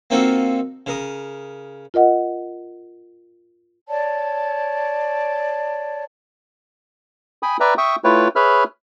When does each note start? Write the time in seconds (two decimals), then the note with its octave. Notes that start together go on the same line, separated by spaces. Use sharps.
0.10 A#3 C4 D#4 F4 F#4 A4
0.86 C#3 A#4 D#6
1.94 F4 A#4 D#5 F#5
3.89 C#5 D5 A5
7.43 G5 G#5 B5 D#6
7.60 B4 D5 E5 G5 A#5
7.78 E5 G5 C#6 D#6
8.04 A3 E4 F4 B4 C#5 G5
8.36 G#4 B4 C#5 E5 B5 F6